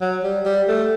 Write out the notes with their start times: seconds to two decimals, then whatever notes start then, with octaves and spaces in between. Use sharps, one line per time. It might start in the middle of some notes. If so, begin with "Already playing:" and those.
0.01 F#3
0.23 G3
0.45 G3
0.68 A3